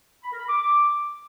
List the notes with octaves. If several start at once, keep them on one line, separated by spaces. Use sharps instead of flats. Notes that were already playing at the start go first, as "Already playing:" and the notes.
B5
A#4
B5
D6